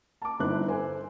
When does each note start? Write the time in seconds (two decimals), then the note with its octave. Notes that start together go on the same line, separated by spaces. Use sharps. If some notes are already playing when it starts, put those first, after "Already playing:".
0.22 A5 D6
0.40 G1 D#4 E4 C5 F#6
0.68 A4 C5 G#5